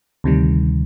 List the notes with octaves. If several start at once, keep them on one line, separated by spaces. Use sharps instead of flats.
D2 C3 D#3 G3